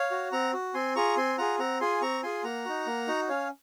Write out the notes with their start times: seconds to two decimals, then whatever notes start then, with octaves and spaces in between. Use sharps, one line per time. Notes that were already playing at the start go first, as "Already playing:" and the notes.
Already playing: C#5 F5
0.11 F#4
0.32 C4 F#5 A#5
0.53 F#4
0.74 C4 G#5 C6
0.96 F4 G#4 A#5 C#6
1.17 C4 G#5 C6
1.38 F4 G#4 F#5 A#5
1.59 C4 F#5 A#5
1.80 F4 G#4 G#5 C6
2.02 C4 A#5 C#6
2.23 F4 G#4 G#5 C6
2.44 A#3 F#5 A#5
2.65 D#4 F#4
2.87 A#3
3.08 D#4 F#4
3.29 C#4 C#5 F5